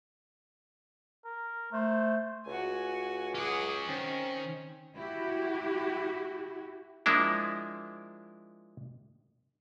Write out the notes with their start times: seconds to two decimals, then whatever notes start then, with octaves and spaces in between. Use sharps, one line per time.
1.25 A#4
1.73 A3 C5
2.46 C#2 F#4 G#5
3.35 C#4 G#4 F#5 D6
3.88 D#3 C4 C#4
4.95 E4 F#4 G4
7.06 F3 G#3 A#3 D4 E4